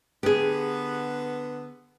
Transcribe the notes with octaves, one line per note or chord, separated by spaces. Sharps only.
D3 B3 G4 G#4